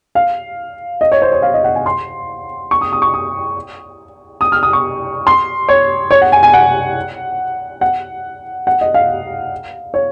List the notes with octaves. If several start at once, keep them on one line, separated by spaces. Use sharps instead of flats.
F5
D#5
C#5
C5
C#5
F5
D#5
F#5
G#5
C6
C#6
D#6
D#6
C#6
D#6
D#6
F6
D#6
C#6
C6
C#5
C#5
F#5
G#5
G#5
F#5
F#5
F#5
D#5
F5
C#5